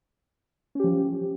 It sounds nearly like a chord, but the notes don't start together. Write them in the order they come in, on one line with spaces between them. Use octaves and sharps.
C#4 G4 F3